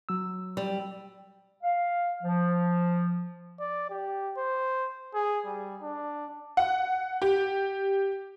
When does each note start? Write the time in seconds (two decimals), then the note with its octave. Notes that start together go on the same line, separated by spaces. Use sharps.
0.09 F#3 E6
0.57 G3
1.63 F5
2.23 F3
3.60 D5
3.90 G4
4.37 C5
5.14 G#4
5.46 G3
5.82 D4
6.57 F#5
7.22 G4